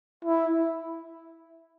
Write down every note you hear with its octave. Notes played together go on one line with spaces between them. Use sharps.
E4